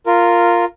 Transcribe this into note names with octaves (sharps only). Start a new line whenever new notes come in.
F4 A#4